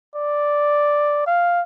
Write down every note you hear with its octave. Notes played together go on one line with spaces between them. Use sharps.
D5
F5